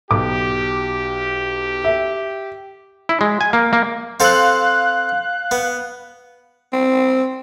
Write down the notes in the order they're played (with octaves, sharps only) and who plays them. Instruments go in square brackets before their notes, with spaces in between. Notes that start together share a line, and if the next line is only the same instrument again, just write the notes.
[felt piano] B1 [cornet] G4 [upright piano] D6
[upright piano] E5
[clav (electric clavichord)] E4
G#3
G#5
A#3
A#3
[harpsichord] C4 A4 C5 [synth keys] F5 F#6
[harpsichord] B3
[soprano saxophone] C4